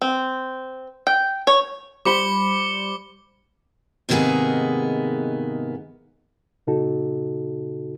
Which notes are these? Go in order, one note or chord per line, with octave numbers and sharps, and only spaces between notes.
C4
G5
C#5
G3 C5 B5 C6 D6 C#7 G7
G#2 C3 D#3 A#3 B3 G#4
A#2 C#3 D#4 F#4 A4